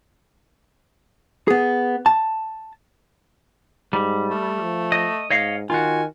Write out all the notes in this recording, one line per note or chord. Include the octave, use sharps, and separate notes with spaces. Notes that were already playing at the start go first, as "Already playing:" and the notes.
B3 G#4
A5
G#2 G3
A3
F3
D#5
G#2 C#5 D#5 F5
D#3 F4 F#4 G#5